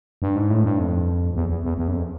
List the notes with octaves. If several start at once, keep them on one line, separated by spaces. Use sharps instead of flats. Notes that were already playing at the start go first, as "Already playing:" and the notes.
G2
G#2
A2
G2
F2
E2
E2
E2
E2
F#2
F2